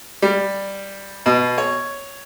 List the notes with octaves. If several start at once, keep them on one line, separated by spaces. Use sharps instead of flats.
G3
B2
C#5